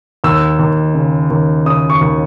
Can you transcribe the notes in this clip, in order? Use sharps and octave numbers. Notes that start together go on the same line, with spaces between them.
D#2 E6
D#2
C#3
D#2
C#3 D#6
C#6
D#2